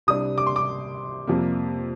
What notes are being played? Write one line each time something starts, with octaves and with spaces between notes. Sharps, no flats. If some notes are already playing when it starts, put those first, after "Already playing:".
C2 C3 G3 D4 D#6
D6
C6
D6
F2 C3 G3 A#3